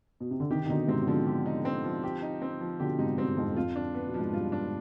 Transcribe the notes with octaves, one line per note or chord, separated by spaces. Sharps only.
B2
C3
D3
C3 D#3 G4
D#3
B2 D3 D#4
G#2 C3 C4
C3
B2 D3 F3
G4
D#4
C4
F3
G4
D#4
C4
F3
B2 D3 G4
G#2 C3 D#4
G2 B2 C4
F2 G#2 F3
F2 F4
D4
B3
B2
F3
G#2
G2 F4
D4